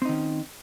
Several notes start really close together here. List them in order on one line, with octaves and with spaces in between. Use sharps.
C4 D#4 D#3 C#4